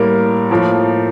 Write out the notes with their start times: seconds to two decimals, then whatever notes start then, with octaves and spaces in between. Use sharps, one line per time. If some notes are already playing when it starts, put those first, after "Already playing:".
Already playing: A2 G3 A#3 A#4
0.51 A2 F3 A#3